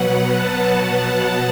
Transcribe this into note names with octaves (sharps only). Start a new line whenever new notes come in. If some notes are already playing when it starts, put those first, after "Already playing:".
Already playing: B2 F#3 B3 F#5
A5
A5